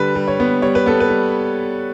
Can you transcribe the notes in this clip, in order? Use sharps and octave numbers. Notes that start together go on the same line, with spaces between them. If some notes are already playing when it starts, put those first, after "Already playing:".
Already playing: D3 G3 B4
G3
C#5
B3
G3 C#5
B4
B3 A4
B4
G3